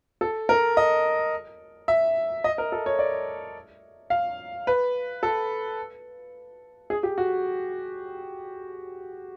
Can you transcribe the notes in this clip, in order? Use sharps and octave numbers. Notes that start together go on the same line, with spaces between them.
A4
A#4
D#5
E5
D#5
A#4
A4
C#5
D5
F5
B4
A4
G#4
G4
F#4